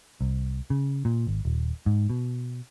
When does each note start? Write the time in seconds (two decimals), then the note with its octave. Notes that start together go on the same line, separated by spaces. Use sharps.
0.21 C2
0.70 C#3
1.05 A#2
1.27 G#1
1.45 D#1
1.86 G#2
2.10 B2